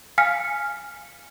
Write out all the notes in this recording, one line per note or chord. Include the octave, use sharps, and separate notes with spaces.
F5 G#5 F6 B6 C#7